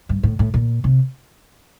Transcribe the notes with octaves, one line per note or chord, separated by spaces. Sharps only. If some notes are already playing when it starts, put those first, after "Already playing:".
G2
A2
A2
A#2
C3